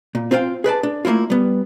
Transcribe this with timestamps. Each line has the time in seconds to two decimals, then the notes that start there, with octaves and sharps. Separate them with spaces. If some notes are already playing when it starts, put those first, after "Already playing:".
0.15 A#2
0.31 C4 F4 C5 F5 G5
0.64 G#4 B4 D5 A5
0.83 D4
1.05 A3 A#3 C4 E4 F4
1.30 G3 B3